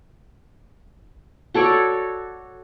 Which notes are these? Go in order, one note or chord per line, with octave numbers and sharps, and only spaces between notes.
F#4 A4 C#5 D5